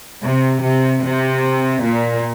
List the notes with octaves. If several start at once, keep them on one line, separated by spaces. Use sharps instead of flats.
C3
C3
C3
A#2